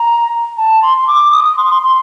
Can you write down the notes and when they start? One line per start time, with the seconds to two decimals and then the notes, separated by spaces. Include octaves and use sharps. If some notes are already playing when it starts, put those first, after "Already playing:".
Already playing: A#5
0.57 A5
0.82 C6
0.97 C6
1.07 D6
1.32 D#6
1.44 D#6
1.57 C6
1.69 C6
1.82 C6